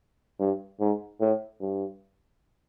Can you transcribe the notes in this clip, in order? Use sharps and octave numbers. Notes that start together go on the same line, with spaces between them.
G2
G#2
A2
G2